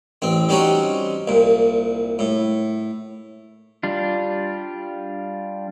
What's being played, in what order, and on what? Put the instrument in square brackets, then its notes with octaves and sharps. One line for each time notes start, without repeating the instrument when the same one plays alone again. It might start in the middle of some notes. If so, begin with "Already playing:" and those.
[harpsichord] A1 C4
G3 C4 C#4 D#4 F#4
C2 A#2
A2
[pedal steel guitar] G3 D4 F4